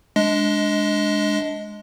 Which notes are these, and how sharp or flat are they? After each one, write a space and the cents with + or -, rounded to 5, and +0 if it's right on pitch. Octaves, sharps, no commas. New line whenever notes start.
G#3 +0 D4 +0 D#5 +20